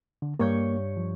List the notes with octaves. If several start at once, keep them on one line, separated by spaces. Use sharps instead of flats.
D3
G2 A#3 C#5 G6
F3